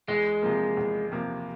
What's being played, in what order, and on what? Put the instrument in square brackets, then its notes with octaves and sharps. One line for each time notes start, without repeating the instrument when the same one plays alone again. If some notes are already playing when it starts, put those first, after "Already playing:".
[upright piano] E2 [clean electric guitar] G#3
[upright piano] C3 F3 A#3
E2
C3 F3 A#3